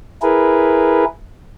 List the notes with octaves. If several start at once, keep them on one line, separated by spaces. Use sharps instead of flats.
E4 G#4 A#4 B4